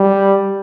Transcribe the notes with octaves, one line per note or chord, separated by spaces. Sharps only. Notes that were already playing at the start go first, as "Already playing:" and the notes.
Already playing: G3